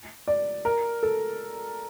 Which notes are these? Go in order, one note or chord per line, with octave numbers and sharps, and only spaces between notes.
D5
A#4
A4